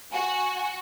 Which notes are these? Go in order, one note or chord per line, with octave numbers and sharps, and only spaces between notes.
F#4 G#5